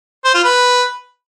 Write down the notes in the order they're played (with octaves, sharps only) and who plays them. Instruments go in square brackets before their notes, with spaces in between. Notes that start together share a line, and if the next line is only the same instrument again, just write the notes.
[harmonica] C5
F4
B4